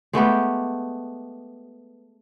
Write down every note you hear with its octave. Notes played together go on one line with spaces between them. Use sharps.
G#3 A3 B3 G4